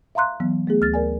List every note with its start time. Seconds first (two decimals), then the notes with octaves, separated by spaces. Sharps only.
0.15 E5 F5 A#5 C6 F#6
0.40 E3 F#3 B3
0.67 A3 B3 G#4
0.81 D2 F6 A6
0.94 A#4 D5 G#5